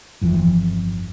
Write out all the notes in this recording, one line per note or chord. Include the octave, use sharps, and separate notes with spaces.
G1 F2 C#3 E3